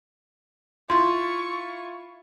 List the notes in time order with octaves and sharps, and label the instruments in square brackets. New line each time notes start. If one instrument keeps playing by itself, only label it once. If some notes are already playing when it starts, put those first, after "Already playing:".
[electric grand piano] E4 F4 [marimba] C6 [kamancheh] C#6